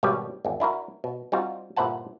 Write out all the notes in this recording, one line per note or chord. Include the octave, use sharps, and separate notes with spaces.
G#1 B2 G3 G4 C#5 D5
G#1 E2
D4 E4 F#4 A#4
B2
G3 C4 D#4 F4 F#4
G1 A#2 E4 C5 F#5 A5